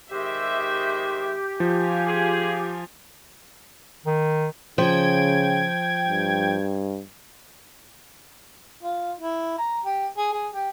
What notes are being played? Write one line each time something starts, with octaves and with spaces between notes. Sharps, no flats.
D#3 G#3 G4 C5 E5
F3 F4 G#5
G#4
D#3
C#3 F3 G5 G#6
G2
F4
E4
A#5
G4
G#4
G#4
G4